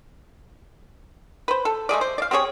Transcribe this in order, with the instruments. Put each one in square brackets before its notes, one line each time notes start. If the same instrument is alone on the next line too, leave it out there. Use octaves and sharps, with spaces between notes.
[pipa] B4 C5
A4
G#3 A3 G#4 D5
C5
D5 F5
C4 G4 G#4 C#5